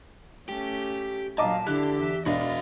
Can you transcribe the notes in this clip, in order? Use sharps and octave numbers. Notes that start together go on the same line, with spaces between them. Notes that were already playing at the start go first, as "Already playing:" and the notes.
A3 C#4 G4
A#2 F#3 D#5 F5 A5 A#5 D6
D3 D4 E4 G4 F#6
E2 E5
E1 F#4 D5 D#5 F5